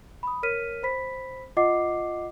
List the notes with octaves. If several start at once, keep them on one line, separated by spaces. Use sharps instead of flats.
B5 D#6
A#4 C#5 F6 B6 D#7
C5 B5 B6
F4 D#5 F#5 D6 C7